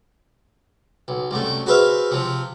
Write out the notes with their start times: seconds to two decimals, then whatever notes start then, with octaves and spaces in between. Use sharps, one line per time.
1.08 B1
1.31 C2 F#2 A3
1.66 F#4 G#4 B4 C5 E5 F5
2.11 C3 F3